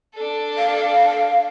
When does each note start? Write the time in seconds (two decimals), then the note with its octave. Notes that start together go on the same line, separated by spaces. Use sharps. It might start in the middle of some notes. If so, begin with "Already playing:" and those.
0.14 D4 A4
0.58 F5